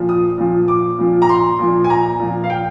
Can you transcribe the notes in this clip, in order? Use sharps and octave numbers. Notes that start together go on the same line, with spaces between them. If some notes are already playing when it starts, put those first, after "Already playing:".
Already playing: A#2 F3
D#6
A#2 F3
D6
A#2 F3
A#5
C6
A#2 F3
G#5
A#5
A#2 F3
F5
G5